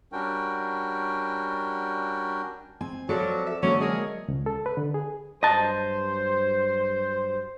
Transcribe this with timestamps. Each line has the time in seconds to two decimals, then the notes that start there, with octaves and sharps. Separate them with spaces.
0.12 G3 C#4 D4 F#4 A#4 G5
2.81 C4 G#5
3.09 F3 F#3 A4 D5 C#6
3.47 E5
3.63 D3 F#3 G#3 A#3 C#4
3.80 G#4 A#4 C#5 D#5
4.28 C#2
4.46 A4
4.66 B4
4.77 D3
4.94 G#4
5.43 G2 F#3 C5 D#5 A5